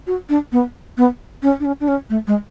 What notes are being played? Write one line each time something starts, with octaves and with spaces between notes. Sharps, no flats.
F#4
D4
B3
B3
C#4
D4
C#4
D4
C#4
A3
G#3